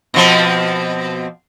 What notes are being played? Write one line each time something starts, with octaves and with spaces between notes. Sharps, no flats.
B2 F3 C4